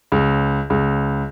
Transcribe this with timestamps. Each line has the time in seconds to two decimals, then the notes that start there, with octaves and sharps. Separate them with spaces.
0.12 C#2
0.70 C#2